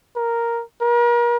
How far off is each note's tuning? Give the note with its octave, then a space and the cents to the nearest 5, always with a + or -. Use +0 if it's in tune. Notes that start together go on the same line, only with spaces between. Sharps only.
A#4 +0
A#4 +40